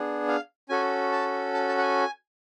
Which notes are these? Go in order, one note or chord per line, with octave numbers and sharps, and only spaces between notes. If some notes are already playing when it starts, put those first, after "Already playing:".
Already playing: B3 D4 G#4
F5
C#4 F#4 A4 G#5
A5
A5
A5
F#5
G#5